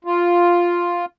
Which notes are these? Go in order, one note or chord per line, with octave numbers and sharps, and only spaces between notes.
F4